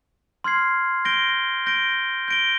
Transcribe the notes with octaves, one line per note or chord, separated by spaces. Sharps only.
C6 F6 G#6 C7
G6 A#6 D7 G7
G6 A#6 D7 G7
G6 A#6 D7 G7